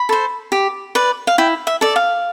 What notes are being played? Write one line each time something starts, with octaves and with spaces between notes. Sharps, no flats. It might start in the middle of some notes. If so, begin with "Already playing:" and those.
Already playing: B5
A4 C5
G4
B4 D5
F5
E4 G5
E5
A4 D5
F5